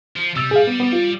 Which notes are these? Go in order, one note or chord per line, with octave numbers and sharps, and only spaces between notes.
F3
C3 G3 E6 A6
G#4 F5
B3
B3
F4